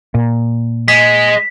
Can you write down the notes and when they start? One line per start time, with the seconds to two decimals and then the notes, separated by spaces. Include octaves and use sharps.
0.14 A#2
0.88 G#3 B6